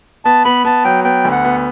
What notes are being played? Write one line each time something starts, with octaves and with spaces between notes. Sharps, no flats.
B3 A5
B3 B5
B3 A5
F#3 G5
B3 G5
D2
F#5
B3